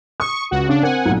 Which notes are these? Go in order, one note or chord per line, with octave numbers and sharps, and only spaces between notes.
C#6 D#6
C#2 F#4
C#3 D4
C4 A#4 F#5 G#5
B1 A#2